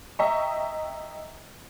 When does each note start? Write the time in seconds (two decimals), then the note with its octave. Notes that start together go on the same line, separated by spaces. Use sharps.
0.19 D#5 E5 G5 A#5 C#6